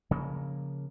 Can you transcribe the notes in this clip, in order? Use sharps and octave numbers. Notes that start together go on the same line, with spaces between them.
C#3 F3 A#3